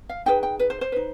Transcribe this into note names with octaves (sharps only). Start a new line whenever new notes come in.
F5
D#4 G#4 B4 G5
G5
B4
C5
C5
D#4 B4